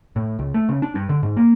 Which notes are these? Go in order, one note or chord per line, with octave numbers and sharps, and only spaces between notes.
A2
C#2
A3
C#3
D4
G2
D3
G#2
A#3